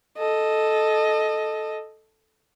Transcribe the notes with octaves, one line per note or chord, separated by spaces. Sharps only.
A4 D#5